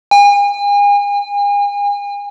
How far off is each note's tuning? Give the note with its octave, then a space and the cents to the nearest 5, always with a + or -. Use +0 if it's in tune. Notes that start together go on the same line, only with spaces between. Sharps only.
G#5 -40